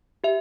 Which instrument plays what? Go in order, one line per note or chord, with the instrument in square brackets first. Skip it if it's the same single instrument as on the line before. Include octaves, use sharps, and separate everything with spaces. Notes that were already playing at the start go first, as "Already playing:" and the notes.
[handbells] G4 E5